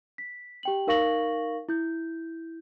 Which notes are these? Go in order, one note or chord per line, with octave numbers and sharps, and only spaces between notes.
B6
G4 G5 F#7
D#4 A#4 F5 C#6 A#6 F#7
E4 G6